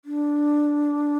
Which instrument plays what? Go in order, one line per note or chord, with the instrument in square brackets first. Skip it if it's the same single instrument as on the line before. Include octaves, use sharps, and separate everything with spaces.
[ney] D4